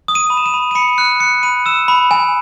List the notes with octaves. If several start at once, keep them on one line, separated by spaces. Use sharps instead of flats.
D#6
D#7
B5
E7
D#7
B5
D#7
B5 C#7
F#6 C#7
F#6 C#7
B5 D#7
E6 E7
B5
G#5